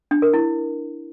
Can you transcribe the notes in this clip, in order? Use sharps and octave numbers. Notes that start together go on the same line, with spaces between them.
D4
A#4
E4